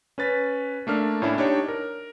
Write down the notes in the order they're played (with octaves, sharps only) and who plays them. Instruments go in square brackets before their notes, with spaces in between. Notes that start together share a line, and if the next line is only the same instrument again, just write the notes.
[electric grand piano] C#4 B4 A6 B6
A3 A#3 D4 F6
A2 C#4 D4 E4
D4 D#4 G4 C#5
A#4